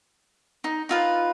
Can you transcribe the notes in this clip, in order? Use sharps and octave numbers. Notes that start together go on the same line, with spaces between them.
D#4
D#4 F4 B4